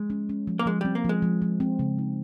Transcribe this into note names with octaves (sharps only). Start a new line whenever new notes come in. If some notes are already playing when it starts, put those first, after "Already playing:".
Already playing: F3 G#3
C#4
C#4
F3
A#3
F3 G#3
G3 C4
A#3
F3 G#3
F3
F3
C4
C#3
D#4